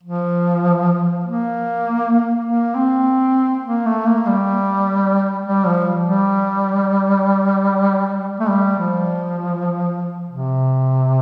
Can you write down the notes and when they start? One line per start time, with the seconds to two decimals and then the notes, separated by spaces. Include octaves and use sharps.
0.03 F3
1.24 A#3
2.45 A#3
2.75 C4
3.66 A#3
3.86 A3
4.06 A#3
4.27 G3
5.46 G3
5.66 F3
6.06 G3
8.40 A3
8.48 G3
8.79 F3
10.29 C3